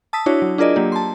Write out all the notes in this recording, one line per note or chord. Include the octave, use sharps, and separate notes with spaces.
A5 D#6 E6 B6
D4 E4 F#4 C#5
F#3
D4 F4 G#4 A#4 D5 D#5
F#3 A#3 G4
A5 C6